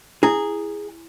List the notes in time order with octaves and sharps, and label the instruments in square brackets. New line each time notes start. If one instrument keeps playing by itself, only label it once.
[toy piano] E4 [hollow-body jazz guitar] G#4